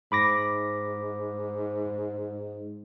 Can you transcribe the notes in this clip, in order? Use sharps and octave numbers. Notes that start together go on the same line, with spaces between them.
G#2 B5 D6 A#6